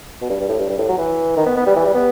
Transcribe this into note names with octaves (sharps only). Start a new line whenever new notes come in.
B2
G2
G2
A2
G2
G2
A2
F#3
E3
D#3
B3
B3
G3
E3
G3
B3